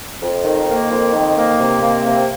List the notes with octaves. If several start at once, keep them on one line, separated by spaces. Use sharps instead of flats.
F2
D#3
A#3
F2
D#3
A#3
C3
A#3
C3